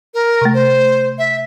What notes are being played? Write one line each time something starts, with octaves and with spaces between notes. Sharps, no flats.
A#4
C3 A3
C5
E5